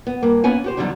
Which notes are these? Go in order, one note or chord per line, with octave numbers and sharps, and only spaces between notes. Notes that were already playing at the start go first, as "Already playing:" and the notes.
B3
G2 A#3
A#3 B3 C#4 B4 F#5 G#5
F#4 G4 C5
E2 G2 D3 F#3 G3 D#4